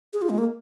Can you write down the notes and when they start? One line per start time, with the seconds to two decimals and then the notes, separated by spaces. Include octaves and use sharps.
0.13 G#4
0.22 F4
0.30 G#3
0.38 A#3